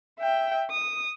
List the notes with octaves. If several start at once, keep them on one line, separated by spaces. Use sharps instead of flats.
E5 G5
D#6